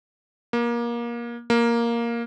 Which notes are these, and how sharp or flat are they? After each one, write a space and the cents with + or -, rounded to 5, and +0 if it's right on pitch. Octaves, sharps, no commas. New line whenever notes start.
A#3 +25
A#3 +5